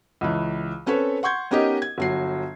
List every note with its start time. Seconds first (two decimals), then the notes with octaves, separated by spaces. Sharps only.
0.21 C#2 E3
0.86 C4 C#4 A4 B4 C#5
1.23 F#5 C6 C#6 G6 G#6
1.51 B3 C#4 D#4 G4 A#4 D#5
1.82 G#6
1.98 G1 F#3 C7